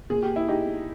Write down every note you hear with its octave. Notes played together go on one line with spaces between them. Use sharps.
A#2 G#4
G4
E4
D#4 G4